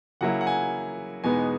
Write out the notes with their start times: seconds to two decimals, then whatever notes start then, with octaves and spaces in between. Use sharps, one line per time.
0.21 C#3 F#3 A#3 E4 F#5
0.41 F#5
0.47 G#5
1.24 E2 B2 G#3 B3 D#4 G#5